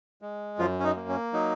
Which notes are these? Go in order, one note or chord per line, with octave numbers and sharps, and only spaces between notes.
G#3
F#2 F3 F4
C#4
D#4
A#3
C#4
F#3 D#4